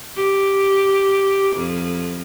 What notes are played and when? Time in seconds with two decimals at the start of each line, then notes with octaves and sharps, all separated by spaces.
0.17 G4
1.56 F2